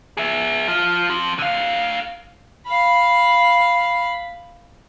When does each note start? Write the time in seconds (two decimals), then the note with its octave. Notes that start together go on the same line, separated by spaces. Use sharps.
0.17 G#4 E5
0.68 F3 F4
1.10 F3 C4
1.38 D3 F5
2.66 F5 B5